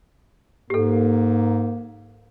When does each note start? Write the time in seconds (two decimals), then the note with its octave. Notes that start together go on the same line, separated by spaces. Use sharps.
0.70 G#2 A#3 G4 A4